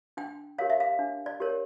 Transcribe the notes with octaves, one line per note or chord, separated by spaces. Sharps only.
D4 G5
G4 A#4 C#5 F5
E5
F5
D4
D5
G4 A#4 C#5